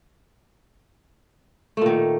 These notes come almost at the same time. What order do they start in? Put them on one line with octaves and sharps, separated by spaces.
A3 A#2 D#3